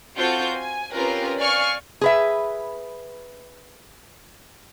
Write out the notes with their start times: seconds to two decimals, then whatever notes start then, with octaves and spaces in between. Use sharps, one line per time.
0.17 C4 F4 F#4 A4 G6
0.54 G#5
0.93 C4 C#4 F4 G4 A#4 B4
1.39 D5 F5 G#5 C#6 F6
2.01 G#4 B4 E5